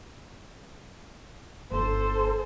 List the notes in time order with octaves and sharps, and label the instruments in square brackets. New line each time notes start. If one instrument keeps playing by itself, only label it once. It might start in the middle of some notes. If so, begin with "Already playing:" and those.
[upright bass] G1 [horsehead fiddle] A4 C5